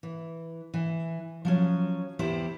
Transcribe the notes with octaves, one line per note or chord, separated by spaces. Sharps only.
E3
E3
F3 F#3 C#4
E2 E4 G4 C5